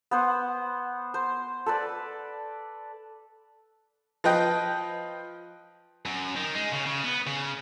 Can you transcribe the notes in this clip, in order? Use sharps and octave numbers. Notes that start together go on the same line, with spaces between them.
B3 C5 F#5
C5
A4 B4 D5
F3 B4 D#5 G5
F#2
D#3
G#3
C#3
C#3
B3
C#3